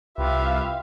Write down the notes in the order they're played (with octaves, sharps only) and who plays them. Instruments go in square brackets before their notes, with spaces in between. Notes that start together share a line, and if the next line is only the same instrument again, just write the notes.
[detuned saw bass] C2 [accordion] F4 G4 B4 [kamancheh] E5 F5